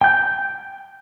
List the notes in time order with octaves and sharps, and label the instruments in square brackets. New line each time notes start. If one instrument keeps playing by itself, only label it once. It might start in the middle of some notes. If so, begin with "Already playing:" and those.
[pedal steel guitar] G5 G6